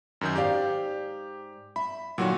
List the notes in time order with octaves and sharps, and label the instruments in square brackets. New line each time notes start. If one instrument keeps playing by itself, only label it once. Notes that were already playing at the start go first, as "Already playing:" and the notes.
[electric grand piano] F#2 D#3 G6
[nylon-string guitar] G#2 D5 F5 [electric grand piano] G4
[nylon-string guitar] E5 [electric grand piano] B5
[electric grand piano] A#2 F#4 [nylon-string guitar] D3 D#3 F#3